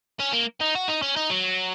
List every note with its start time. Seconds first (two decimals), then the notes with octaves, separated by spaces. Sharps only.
0.20 C#4
0.33 A#3
0.61 D#4
0.75 F#4
0.88 D#4
1.02 C#4
1.16 D#4
1.30 F#3